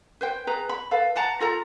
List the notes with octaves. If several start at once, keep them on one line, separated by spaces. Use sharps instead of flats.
B4 C5 G5
G#4 B4 A#5
B5
A4 B4 F5
B4 F#5 A5 A#5
F4 A4 A#5